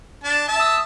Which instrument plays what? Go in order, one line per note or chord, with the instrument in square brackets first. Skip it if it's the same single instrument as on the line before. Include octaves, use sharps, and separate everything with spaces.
[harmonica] D4 A5
E5 A5
[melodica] D#6 E6